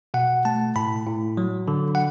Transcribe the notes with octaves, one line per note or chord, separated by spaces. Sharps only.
B2 F#5
A3 A5
A2 B5
A2
F#3
D3
F#5